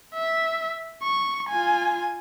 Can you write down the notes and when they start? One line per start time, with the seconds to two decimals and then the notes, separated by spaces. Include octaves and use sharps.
0.14 E5
1.03 C#6
1.49 F4 G#5